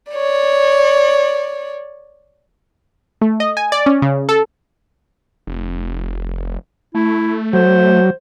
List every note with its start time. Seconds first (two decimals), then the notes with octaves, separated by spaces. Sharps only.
0.12 C#5 D5
3.21 A3
3.40 D#5
3.57 G#5
3.72 D5
3.86 C#4
4.02 C#3
4.29 A4
5.47 F1
6.95 A3 E4
7.53 F#3 C5